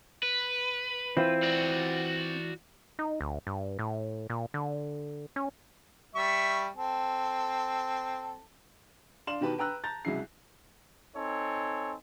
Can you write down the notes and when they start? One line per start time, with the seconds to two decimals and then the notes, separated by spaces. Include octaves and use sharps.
0.23 B4
1.17 E3 C4 F4
1.43 F#4 D5
2.99 D#4
3.21 D2
3.47 G2
3.79 A2
4.30 A#2
4.54 D3
5.36 C#4
6.15 G3 E5 C#6
6.77 C4 A4
9.27 D4 F5 C6 E7 F#7
9.41 B2 D#3 G4 B4 A5 B5
9.58 B4 G5 A#5 E6 F#6
9.84 A5 A#5 G6 A6
10.05 C2 C#3 F#3 G#3 E4 C7
11.16 C4 D#4 A4 C#5 G#5